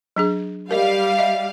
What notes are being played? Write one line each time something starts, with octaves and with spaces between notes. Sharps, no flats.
F#3 D4 G#4
G3 A#4 D#5 F5
D#5 E5